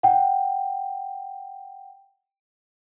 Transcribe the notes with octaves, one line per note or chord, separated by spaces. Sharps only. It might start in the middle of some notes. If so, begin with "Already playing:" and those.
F#5 G5